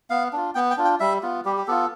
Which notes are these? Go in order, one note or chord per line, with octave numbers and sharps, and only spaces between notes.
B3 F5
D4 F4
B3 G5
G5
D4 F4
G5
G3 E5
B3 F4
G3 G4
G4
B3 F4 A4